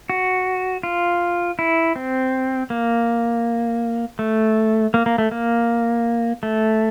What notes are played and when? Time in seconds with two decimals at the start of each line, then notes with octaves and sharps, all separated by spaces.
0.10 F#4
0.83 F4
1.59 E4
1.96 C4
2.70 A#3
4.19 A3
4.94 A#3
5.06 A#3
5.18 A3
5.31 A#3
6.43 A3